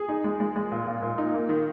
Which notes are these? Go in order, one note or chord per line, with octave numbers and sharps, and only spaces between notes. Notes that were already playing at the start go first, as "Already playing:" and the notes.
Already playing: G#4
D#4
G#3
G#3
G#3
A#2
A#2
A#2
D#4
A#3
D#3